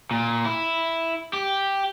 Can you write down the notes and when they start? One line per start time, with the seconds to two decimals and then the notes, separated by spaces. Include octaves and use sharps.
0.11 A#2
0.46 E4
1.33 G4